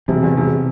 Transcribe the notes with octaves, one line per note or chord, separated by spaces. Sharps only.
E1 C3
E2
E1